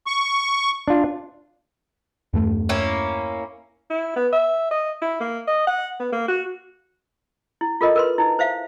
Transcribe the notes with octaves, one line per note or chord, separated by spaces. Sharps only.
C#6
D4 F4
E2 G2 A3
A#3 C#4 E4
E4
B3
E5
D#5
E4
A#3
D#5
F#5
B3
A#3
F#4
E4
F4 A4 A#4 D#5
A#4 B4 C6
D#4 E4
C5 E5 F5